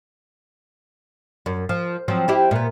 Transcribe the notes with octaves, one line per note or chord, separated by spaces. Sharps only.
F#2
F3
F3 F#3 C4
C4 E4 G4
A#2 B3